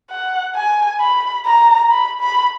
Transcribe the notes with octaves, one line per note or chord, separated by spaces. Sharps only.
F#5
G#5
B5
A#5
B5
B5